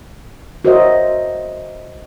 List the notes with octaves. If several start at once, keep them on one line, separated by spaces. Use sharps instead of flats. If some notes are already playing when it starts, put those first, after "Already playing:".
F#4 A#4 C5 C#5 D#5 E5